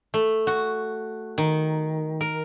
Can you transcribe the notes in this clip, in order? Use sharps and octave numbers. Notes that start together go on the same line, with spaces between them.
A3
F#4
D#3
A#4